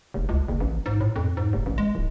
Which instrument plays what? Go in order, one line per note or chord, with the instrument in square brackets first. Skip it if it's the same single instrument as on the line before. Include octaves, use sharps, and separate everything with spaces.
[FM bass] F1
C#2
F#1
A1
G#2
A2
F2
G#2
F1
A1
G#3
D1